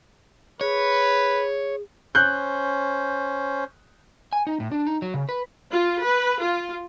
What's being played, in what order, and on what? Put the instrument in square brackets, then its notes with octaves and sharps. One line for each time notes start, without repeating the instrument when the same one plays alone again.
[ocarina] G#4 [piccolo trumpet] B4 [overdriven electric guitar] C#5
[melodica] C#4 C5 [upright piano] F#6 G6
[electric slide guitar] G#5
D#4
A2
D4
D#4
F#3
C#3
B4
[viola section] F4
B4
F4